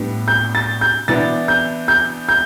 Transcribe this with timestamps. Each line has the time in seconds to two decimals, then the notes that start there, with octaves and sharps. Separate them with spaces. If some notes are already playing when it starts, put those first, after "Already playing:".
Already playing: A2 G3 B3 D4
0.28 G6
0.55 A6
0.81 G6
1.08 E3 B3 D4 A6
1.48 G6
1.88 G6
2.29 G6